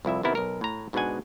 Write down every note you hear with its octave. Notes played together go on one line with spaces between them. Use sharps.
C2 F2 E4 E5
C3 D#3 B3 E4 A#4
B1 A#4
A2 A#5
G#2 B2 G#3 D4 F#5 G#5